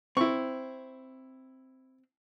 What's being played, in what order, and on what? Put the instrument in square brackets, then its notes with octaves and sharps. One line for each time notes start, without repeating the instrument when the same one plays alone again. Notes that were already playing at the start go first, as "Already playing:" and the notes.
[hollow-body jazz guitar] C4 [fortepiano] E4 C#6